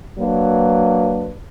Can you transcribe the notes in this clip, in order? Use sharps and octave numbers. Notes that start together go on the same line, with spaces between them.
F#3 A#3 D4 B4